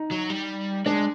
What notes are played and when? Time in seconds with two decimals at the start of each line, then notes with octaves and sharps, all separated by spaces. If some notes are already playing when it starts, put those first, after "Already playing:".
Already playing: D#4
0.11 F#3
0.30 G3
0.86 G#3 D4